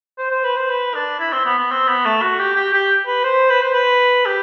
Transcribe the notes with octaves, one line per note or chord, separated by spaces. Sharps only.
C5
C5
B4
C5
B4
D4
E4
C4
B3
B3
C4
B3
A3
F#4
G4
G4
G4
B4
C5
B4
C5
B4
G4